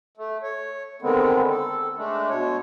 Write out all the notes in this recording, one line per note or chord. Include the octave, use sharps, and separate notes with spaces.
A3
C#5
D3 D#3 G#3 B3 C4
A4
G#3 A3 D4
B2 C#5